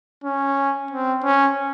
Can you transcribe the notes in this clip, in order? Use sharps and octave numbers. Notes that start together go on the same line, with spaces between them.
C#4
C4
C#4